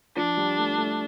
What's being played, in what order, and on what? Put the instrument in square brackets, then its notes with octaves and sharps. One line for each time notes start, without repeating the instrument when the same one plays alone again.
[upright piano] F3 [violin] D4
[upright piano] G3
A3
A3